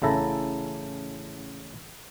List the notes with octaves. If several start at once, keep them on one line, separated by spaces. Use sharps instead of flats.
A1 C#3 E4 A4 A#5